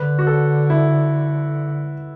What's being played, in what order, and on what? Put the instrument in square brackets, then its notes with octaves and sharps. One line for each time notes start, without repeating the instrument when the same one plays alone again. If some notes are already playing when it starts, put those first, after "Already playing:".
Already playing: [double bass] D3 [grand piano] B4
[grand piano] F#4
A4
E4